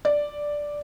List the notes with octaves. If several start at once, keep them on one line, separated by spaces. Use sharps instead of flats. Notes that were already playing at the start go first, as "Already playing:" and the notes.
D5